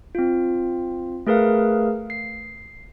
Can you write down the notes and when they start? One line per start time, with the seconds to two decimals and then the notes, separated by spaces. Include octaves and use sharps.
0.15 C4 F4
1.27 A3 G#4 A#4 B4 F5
2.10 C7